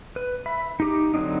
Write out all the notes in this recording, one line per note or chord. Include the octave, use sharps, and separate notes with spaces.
B4
E5 B5
D#4 G4 D6
D3 F#3 C4 D4 D#4